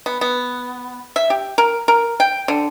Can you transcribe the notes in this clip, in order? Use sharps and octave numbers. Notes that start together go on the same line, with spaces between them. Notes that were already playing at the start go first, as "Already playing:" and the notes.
B3
B3
E5
G4
A#4
A#4
G5
D3